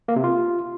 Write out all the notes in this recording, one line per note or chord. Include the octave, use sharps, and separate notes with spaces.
A#3
C3
F4